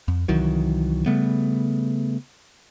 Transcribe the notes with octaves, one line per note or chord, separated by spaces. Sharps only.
F2
C2 D#3 E3 F#3
C#3 G3 A3 B3